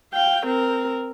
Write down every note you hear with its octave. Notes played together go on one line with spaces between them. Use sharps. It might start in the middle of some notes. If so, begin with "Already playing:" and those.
F5 G5
C4 A#4